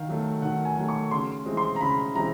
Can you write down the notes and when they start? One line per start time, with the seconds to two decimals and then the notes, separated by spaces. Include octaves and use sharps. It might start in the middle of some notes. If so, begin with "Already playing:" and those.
Already playing: D#3 F5
0.08 F#3 A3
0.42 D#3 F#5
0.65 G#5
0.77 F#3 A3
0.89 C#6
1.11 C#3 C6
1.46 E3 G#3 C4
1.57 C6
1.76 A#5
1.80 C#3 B5
2.15 E3 G#3 C4 A#5